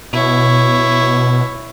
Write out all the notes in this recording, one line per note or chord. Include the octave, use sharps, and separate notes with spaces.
B2 E4 C#5